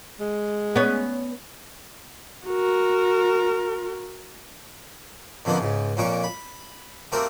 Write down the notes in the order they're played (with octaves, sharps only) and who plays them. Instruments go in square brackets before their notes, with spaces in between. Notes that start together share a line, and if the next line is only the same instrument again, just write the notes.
[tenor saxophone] G#3
[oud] B3 C#4
[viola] F#4 A#4
[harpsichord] F2 D3 F3 A#3 B3 D#4
C#2 G#2
F2 A#2 A#3 C#4 C#6 D6
B5
A3 A#3 C4 F#4 G4 A#4